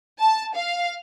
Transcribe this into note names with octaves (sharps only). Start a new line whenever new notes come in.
A5
F5